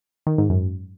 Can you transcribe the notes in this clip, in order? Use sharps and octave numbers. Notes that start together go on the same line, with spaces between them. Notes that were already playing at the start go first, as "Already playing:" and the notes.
D#3
G#2
F#2